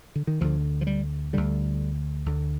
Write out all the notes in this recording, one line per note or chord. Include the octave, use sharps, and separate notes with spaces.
D3
D#3
D2 D3 F3
F3
G3
D2 D3 G3
D2 D3